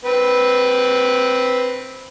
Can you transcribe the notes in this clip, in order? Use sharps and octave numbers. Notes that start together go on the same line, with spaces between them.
C4 B4